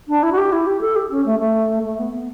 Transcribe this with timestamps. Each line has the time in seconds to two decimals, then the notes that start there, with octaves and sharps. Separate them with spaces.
0.08 D4
0.23 E4
0.32 F#4
0.38 G4
0.52 E4
0.67 G4
0.81 A4
0.96 G4
1.11 C#4
1.26 A3
1.40 A3
1.84 A3
1.99 B3
2.13 B3